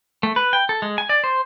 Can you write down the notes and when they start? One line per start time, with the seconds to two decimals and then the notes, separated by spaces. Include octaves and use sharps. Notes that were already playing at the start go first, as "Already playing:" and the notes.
0.23 A3
0.36 B4
0.53 G5
0.69 A4
0.82 G#3
0.98 G#5
1.09 D5
1.24 C5